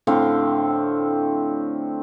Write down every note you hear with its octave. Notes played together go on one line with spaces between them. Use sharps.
A2 D3 C4 F5